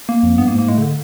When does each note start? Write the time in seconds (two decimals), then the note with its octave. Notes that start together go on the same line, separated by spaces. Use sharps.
0.09 A#3
0.23 F2
0.38 G2 B3
0.48 A#3
0.53 G#2
0.59 A#3
0.68 A2 G#3
0.78 C#3
0.82 D3